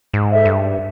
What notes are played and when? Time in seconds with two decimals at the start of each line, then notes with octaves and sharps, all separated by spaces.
0.13 G#2
0.30 A4 C5 E5
0.45 G2